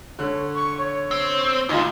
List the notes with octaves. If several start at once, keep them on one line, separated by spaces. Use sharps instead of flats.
D3 C#5 F#6
C#6
C#5
C4
D2 D#4 F4